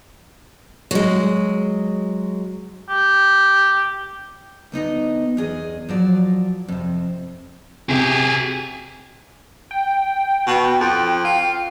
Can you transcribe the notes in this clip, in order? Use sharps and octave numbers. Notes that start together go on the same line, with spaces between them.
F#3 G#3
G4
D2 B3 D#4 D#5
E2 G#4 D#5
F3 F#3 D5
F2 C3
C3 G4 G#4
G5
B2
F2
F4